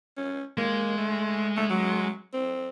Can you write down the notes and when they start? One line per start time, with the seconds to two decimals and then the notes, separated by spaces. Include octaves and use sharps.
0.17 C#4
0.57 G#3 A#3
0.97 A3
1.57 A3
1.70 F#3
2.33 C4